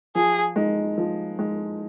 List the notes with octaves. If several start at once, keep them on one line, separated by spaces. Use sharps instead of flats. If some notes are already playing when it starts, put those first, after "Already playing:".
F3 G#4
G#3 D#4
F3
G#3 D#4